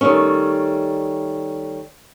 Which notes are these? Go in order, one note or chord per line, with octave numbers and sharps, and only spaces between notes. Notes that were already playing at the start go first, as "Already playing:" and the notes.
D#3 F#3 G3 A3 C#4